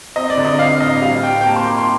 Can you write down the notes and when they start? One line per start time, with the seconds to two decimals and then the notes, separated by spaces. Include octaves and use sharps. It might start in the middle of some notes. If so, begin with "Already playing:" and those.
0.16 C4 D#5
0.30 D5
0.37 D3
0.45 D#5
0.59 C4 F5
0.80 A2 D#5
1.02 G3 F5
1.23 C4 G5
1.41 G5
1.45 A#3 A5
1.56 C6
1.67 D#4 D6
1.78 C6